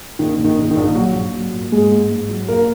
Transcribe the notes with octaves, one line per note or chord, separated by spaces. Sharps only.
A#1 D#3 D#4
A#1
D#3 D#4
A#1
D#3 D#4
A#1
A#1 F#3 F#4
A#1
F#3
A#2
G#2 G#3 G#4
G#2
G#2
F#3
A#1 A#3 A#4